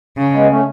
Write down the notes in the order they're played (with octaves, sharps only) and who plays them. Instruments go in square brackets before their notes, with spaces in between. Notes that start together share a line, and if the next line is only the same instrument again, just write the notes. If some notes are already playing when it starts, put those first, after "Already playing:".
[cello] C#3
[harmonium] G#3 B3
A3 C#4